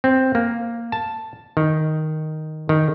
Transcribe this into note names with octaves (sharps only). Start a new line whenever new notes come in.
C4
A#3
A5
D#3
D#3